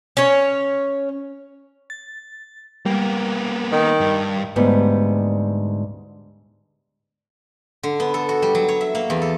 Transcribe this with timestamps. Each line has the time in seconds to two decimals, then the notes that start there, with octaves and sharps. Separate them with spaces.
0.17 C#4 C#5
1.90 A6
2.86 G3 A#3 B3
3.72 D#3
4.00 G2
4.56 D2 G#2 G3 B3
7.83 D3
8.00 B3
8.14 A4
8.29 F#4
8.42 G3
8.55 F#3
8.68 C#5
8.81 E5
8.95 A#3
9.10 E2
9.22 A4